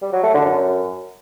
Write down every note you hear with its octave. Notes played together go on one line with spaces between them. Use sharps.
G3
F#3
A3
D3
F#2